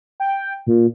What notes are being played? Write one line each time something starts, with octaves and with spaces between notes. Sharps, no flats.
G5
A#2